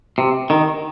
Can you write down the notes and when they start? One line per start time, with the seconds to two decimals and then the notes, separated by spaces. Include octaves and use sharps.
0.18 C3
0.50 D#3